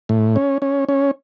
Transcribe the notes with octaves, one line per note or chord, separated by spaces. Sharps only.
A2
C#4
C#4
C#4